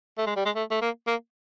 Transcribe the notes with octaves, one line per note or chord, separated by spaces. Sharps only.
A3
G#3
G3
G#3
A3
A3
A#3
A#3